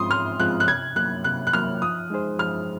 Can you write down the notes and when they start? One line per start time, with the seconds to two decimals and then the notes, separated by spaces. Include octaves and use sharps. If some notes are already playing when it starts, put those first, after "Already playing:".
Already playing: G#2 F3 G#3 C4 F4 C6 D#6
0.10 G#2 F6
0.39 F3 G#3 C4 F4 F#6
0.60 F#6
0.68 C3 G#6
0.96 F#3 A#3 F#6
1.24 C3 F#6
1.47 F#6
1.53 F#3 A#3 F6
1.82 F3 D#6
2.10 G#3 D#4 G#4 C5
2.39 F3 F6